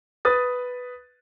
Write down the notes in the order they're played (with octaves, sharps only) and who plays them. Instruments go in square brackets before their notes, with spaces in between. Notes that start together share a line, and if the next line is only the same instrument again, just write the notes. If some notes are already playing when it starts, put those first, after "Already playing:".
[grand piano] B4 D#6 A6